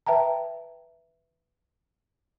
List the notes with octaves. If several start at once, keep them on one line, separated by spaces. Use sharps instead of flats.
B4 E5 G5 A5 A#5